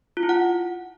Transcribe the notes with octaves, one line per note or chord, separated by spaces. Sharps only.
F4
E4
F#5